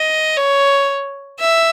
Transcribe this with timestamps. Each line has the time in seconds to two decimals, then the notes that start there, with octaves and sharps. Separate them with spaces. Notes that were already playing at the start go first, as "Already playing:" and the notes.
Already playing: D#5
0.37 C#5
1.40 E5